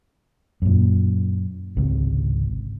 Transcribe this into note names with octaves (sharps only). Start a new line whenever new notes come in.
F#2 A#2
G#1 C#2 C3